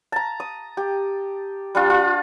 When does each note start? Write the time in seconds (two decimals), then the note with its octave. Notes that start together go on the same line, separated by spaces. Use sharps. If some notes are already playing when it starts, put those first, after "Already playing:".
0.12 A5 A#5
0.40 D#6
0.77 G4
1.75 G3 D4 F4
1.90 F4